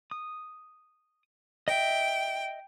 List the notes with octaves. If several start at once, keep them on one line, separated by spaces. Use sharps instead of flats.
D#6
D#5 E5 G5